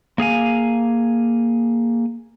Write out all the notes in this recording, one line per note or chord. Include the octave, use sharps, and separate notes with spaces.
A#3 G#4 F5 G#5